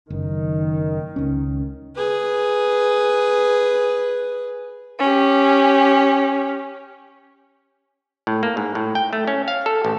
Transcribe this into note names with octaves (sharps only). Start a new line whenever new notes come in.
F#1 D#3
C#2 C#4
G#4 B4
C#4 G4
A2
A#3
G#2
A2
G5
A3
C#4
F5
A4
A1